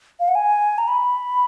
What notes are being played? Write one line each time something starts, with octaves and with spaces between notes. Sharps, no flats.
F5
F#5
G#5
A#5
B5